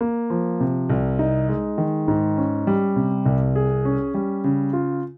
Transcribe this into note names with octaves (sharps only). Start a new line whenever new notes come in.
A#3
F3
C3
C2
D#4
G#3
D#3
G#2
C#4
G3
C3
C2
G#4
C#4
G3
C#3
F4